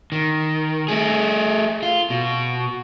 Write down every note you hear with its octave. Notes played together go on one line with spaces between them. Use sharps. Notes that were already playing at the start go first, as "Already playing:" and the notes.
D#3
A3 G#4
F4
B2